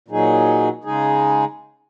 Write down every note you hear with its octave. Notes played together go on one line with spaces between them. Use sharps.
A#2 F#3 D#4 G#4
C#3 G#3 D#4 G#4